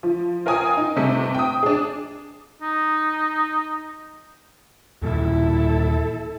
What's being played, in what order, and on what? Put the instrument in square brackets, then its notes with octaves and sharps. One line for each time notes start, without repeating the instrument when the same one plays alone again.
[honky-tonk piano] F3
F4 A#4 G5 G#5 D#6
D#4
G1 C3 A3
G5 D#6
D4 G#4
[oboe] D#4
[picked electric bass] D#2 A#2 E3 [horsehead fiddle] E4 A4